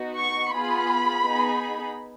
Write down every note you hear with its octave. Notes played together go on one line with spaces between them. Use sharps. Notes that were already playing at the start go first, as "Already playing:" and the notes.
Already playing: B3 D#4 F#4
C#6
B3 F4 G#4 B5
B3 D#4 G#4